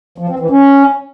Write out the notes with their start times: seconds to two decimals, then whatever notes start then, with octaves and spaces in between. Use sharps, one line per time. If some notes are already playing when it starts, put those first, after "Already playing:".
0.18 F3
0.29 C4
0.39 E3
0.50 C#4